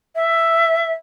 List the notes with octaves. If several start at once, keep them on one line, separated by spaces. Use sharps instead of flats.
E5